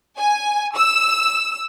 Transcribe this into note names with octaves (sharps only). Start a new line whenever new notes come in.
G#5
E6